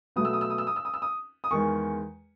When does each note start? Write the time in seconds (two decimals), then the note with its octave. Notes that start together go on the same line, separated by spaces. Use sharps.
0.16 B2 F#3 A3 D#6
0.25 E6
0.33 D#6
0.41 E6
0.50 D#6
0.58 E6
0.67 D#6
0.76 E6
0.85 D#6
0.94 E6
1.02 D#6
1.44 D#6
1.50 E2 D#3 G#3 C#6